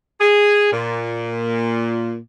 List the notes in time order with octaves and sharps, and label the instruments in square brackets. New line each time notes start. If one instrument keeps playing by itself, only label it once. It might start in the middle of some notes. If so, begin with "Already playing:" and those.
[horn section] G#4
A#2